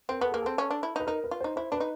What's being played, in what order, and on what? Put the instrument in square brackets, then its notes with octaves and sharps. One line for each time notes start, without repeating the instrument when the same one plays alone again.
[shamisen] C4 [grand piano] A#4
[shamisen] B3 [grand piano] A4
[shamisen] A#3 [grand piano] G#4
[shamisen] C4 [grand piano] A4
[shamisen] C#4
D4
E4
D#4
[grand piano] B4
[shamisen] D#4 [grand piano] A#4
[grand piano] B4
[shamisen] F4
[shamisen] D#4 [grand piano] C5
[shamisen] E4 [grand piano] C5
[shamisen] D4 [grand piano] B4
[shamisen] D#4